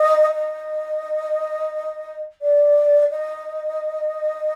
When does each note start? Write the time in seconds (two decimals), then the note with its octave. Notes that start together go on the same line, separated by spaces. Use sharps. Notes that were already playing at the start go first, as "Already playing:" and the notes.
Already playing: D#5
0.33 D#5
2.42 D5
3.11 D#5